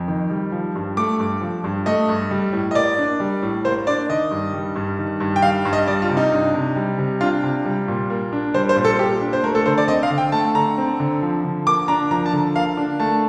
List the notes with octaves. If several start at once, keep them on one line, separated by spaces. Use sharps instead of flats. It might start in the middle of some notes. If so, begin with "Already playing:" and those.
Already playing: F2
D#3
G3
F3
G2
A3 D6
G2
F3
G2
A3 D#5
G2
G3
A2
D#5
A#3 D5
D4
G3
A2
A#3 C5
D4 D5
D#3 D#5
G2
G3
G2
D#3
G2
G5
G3 F5
G2
D#5
G3 D5
F4
C3
D#4
D4
C3
G3
C3
D4 F4
C3
G3
A#2
A#3
D4
G3 C5
C5
A#2
A4
A#3 G4
D4
C5
A3 A#4
A4
D3 C5
D5
C4 D#5
F5
D3
G5
A3 A5
D3 A#5
C4
D3
F3
D3
A#3 D6
D4 A#5
F3 A#5
A5
D3
A#3 F5
D4
A3 A5